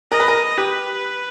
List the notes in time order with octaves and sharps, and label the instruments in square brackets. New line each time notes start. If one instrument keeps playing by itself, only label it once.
[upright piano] A#4 [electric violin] D#5
[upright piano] B4
A#4
[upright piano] G4 [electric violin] B4